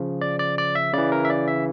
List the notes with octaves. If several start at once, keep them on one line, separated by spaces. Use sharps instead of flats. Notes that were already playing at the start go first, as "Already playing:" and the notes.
Already playing: C#3 F3
D5
D5
D5
E5
C#3 E3 D5
A#4
E5
D5
E5